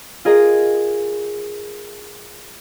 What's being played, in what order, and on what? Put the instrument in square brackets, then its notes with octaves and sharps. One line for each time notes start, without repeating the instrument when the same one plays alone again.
[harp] F4 G#4 A#4 D#5